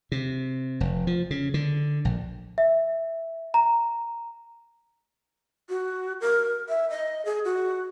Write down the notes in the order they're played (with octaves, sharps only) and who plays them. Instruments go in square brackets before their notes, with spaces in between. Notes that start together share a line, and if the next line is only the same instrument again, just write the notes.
[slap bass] C3
F1
F3
C#3
D3
A#1
[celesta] E5
A#5
[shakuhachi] F#4
A#4
E5
D#5
G#4
F#4